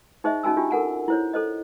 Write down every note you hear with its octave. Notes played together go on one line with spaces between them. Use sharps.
D#4 G#4 C5 D#5 E5
C#4 D#4 F#4 G#5 E6
D4 F4 G4
A4 A#4 F#5 G#5
E4 C5 C#5
A4 C5 D#5